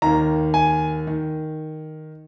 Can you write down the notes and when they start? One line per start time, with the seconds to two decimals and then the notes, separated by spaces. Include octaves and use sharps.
0.02 D#2 D#3 A#3 A#5
0.54 G#5
1.07 D#3